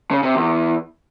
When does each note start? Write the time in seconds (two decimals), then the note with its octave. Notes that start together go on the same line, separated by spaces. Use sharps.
0.11 C#3
0.23 C3
0.35 E2